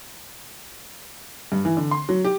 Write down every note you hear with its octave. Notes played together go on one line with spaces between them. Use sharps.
G2
E3
D3
C6
F#3
G4